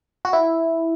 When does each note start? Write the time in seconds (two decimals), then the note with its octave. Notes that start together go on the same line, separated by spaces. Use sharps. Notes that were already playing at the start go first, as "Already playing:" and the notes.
0.25 F#4
0.33 E4